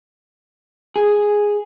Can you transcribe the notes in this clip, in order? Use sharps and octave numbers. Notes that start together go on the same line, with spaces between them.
G#4